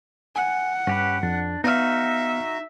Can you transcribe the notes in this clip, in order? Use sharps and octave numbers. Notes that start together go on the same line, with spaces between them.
F#5 G#5
G2 C#4 G4 B4
F2 D4
B3 D#4 F#4 E5 F5 F6